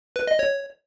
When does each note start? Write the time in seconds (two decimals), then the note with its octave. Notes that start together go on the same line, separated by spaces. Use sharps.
0.16 B4
0.27 D#5
0.39 C#5